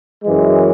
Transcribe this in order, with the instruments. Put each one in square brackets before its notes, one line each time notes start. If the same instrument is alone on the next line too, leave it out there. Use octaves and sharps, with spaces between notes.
[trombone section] F#2 E3 G#3